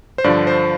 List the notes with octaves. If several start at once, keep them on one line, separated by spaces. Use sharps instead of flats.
C5
G2 D3 F3 D5
C5